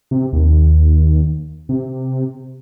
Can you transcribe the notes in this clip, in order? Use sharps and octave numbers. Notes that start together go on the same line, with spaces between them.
C3
D#2
C3